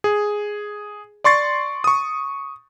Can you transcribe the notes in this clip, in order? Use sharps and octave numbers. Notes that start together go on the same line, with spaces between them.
G#4
D5 C6 C#6 A6 C7
C#6 D#6